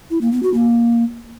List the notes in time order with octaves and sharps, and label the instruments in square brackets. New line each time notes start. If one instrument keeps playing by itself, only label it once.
[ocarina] E4
A#3
B3
F#4
A#3